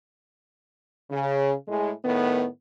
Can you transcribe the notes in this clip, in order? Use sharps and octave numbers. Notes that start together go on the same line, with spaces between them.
C#3
A2 G#3
A2 D#3 B3